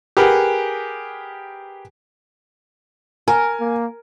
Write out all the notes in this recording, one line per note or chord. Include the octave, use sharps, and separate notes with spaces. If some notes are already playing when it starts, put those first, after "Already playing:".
G4 G#4 A#4 B4 F#5
A#4 G#5
A#3